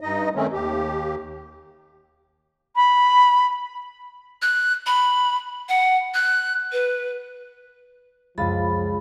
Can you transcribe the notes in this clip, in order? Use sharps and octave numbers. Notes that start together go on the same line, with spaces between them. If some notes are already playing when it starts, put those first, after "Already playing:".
G2 D#4 D#5
D#3 A3 C4 C#4
D#2 G4
B5
F#6
B5
F#5
F#6
B4
C#2 F#2 F3 F5 B5 A6